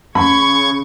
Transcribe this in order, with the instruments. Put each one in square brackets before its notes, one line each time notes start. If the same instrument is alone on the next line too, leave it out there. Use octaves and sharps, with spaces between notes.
[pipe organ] C#3 C#6 G#6 [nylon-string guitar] C#4 [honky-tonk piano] B5